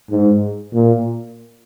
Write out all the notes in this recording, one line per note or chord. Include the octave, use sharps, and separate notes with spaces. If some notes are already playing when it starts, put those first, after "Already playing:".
G#2
A#2